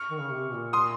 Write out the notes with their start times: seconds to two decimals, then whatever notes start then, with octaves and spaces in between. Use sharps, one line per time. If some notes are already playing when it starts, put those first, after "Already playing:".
Already playing: C#6 F6
0.10 D#3
0.20 C#3
0.32 C3
0.53 A#2
0.73 C6 D#6